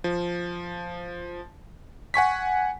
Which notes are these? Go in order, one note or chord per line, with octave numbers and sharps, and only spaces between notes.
F3
F#5 G#5 C#6 B6